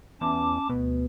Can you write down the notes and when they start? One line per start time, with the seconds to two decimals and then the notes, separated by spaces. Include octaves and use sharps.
0.21 E2 C#4 A5 D6
0.69 D2 B2